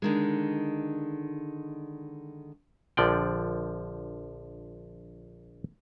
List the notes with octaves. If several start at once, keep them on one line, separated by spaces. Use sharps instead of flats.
D3 D#3 G#3
A#1 D3 F3 D5 G5